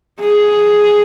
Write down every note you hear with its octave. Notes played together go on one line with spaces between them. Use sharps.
G#4